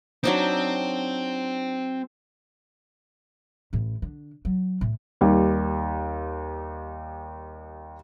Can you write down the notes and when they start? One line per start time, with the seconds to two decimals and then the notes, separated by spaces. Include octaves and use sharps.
0.24 F#3 C4 D4 D#4
3.73 A1 A2
4.02 D3
4.45 F#3
4.81 A2
5.21 D#2 G3